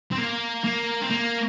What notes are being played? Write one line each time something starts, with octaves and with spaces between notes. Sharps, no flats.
C4
A#3
A#3
C4
A#3